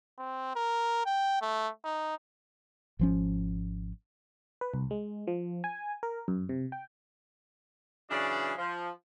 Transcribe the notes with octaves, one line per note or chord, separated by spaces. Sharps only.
C4
A#4
G5
A3
D#4
G#1 F3 C#4
B4
C2
G#3
F3
G#5
A#4
F#2
C3
G5
C#3 E3 F#3 D4 D5
F3